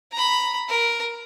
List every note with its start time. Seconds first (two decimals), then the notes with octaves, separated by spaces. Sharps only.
0.12 A#5 B5
0.68 A#4